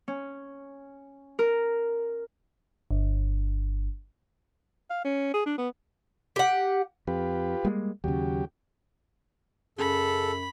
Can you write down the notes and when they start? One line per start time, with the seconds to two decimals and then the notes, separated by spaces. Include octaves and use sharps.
0.08 C#4
1.39 A#4
2.91 G1
4.90 F5
5.04 C#4
5.34 G#4
5.46 D4
5.58 B3
6.36 G4 F#5
7.07 F2 F4 G4 B4
7.65 G3 G#3 A#3
8.04 D#2 C#3 F#3 G4
9.78 F#2 C#3 A4 B5